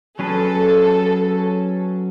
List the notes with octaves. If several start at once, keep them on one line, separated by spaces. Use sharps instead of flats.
F#3 C#4 G#4 A4 B4